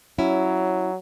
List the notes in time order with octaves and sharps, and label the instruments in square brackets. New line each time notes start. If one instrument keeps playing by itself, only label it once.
[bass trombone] F#3 [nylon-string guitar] C#4 E4